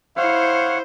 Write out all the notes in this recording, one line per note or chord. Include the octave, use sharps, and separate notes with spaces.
E4 C5 C#5 F5 F#5